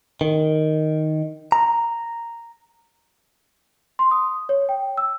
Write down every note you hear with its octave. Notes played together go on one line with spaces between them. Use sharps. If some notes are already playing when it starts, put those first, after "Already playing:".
D#3
A#5
C6
D#6
C#5
G5
E6